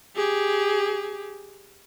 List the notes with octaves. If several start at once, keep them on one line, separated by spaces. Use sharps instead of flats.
G4 G#4